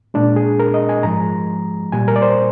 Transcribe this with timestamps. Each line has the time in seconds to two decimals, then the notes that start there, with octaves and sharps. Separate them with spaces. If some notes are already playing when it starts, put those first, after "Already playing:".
0.14 A#2 G#3 D4
0.36 G#4
0.60 A#4
0.74 D#5
0.89 G#5
1.03 G#2 F3 G#3 A#5
1.92 A#2 G3 G#5
2.08 A#4
2.16 D5
2.22 C5